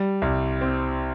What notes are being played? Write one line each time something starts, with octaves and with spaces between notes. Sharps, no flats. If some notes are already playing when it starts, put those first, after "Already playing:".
Already playing: G3
C2
C4